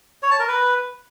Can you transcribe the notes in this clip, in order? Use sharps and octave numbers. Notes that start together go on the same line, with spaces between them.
C#5
A5
A#4
B4